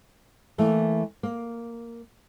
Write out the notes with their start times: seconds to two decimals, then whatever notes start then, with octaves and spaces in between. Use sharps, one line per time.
0.58 E3 A3 A#3
1.23 A#3